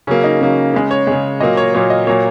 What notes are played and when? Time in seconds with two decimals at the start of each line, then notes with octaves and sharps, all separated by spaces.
0.07 C#3 F#3 A#3 C#4
0.24 D#4
0.41 C#3 F#3 A#3
0.74 C#3 G#3
0.91 C#5
1.07 C#3 G#3
1.40 A#2 F#3 A#3 D#5
1.57 C#5
1.74 A#2 F#3 A#3 C#5
1.90 D#5
2.07 A#2 F#3 A#3 C#5